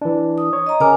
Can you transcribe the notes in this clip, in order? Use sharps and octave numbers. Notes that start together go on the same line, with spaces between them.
E3 D4
D#6
C#5
D#5 A#5
C#3 A#4 C#5 G#5 D6